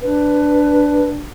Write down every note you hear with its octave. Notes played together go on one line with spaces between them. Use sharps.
D4 B4